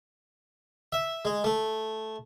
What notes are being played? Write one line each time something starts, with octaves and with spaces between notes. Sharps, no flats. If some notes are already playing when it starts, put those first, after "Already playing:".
E5
G#3
A3